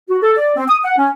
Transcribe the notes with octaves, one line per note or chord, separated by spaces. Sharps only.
F#4
A4
D5
C4
D#6
F#5
C#4